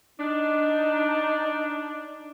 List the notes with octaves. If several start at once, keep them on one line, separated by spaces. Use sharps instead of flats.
D4 D#4